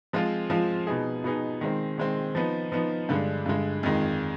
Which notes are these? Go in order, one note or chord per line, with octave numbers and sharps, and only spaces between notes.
F3 G#3 C4 F4
F3 G#3 C4 F4
B2 B3 D#4 G#4
B2 B3 D#4 G#4
D#3 G#3 C4
D#3 G#3 C4
F3 B3 D#4
F3 B3 D#4
G2 D3 G#3
G2 D3 G#3
F2 D#3 G#3